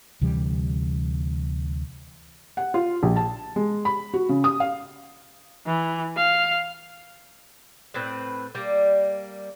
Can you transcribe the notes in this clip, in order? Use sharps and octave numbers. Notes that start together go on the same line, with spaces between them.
D2 C3 E3 G3
F#5
F4
A#1
A5
G#3
B5
F#4
C#3
D#6
F5
E3
F5
A2 C4 B4
G3 A#3